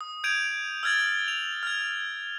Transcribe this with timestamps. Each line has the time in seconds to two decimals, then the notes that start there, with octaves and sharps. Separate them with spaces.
0.01 D#6
0.24 G6 G#6 D7 D#7 F7
0.83 E6 F6 G#6 A6 F#7
1.28 F7
1.63 F6 G#6